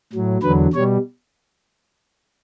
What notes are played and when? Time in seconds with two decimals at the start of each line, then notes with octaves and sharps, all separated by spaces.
0.13 A2 F#3
0.43 E2 D3 F#3 B4
0.73 B2 G3 C#5